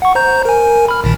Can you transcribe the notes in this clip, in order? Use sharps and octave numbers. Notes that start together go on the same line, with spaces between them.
F#5 C#6
C5 A#5 G6
A#4 G#5
B5 F6
A#1 A#2 D#3